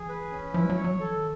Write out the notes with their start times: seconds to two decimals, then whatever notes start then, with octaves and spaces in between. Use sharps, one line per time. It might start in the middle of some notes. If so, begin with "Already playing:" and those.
Already playing: E3 G#4
0.09 B4
0.31 C#4
0.53 F3 E4
0.64 G3
0.70 F#3
0.76 C#5
0.84 F#3
0.99 E3 A4
1.14 D#3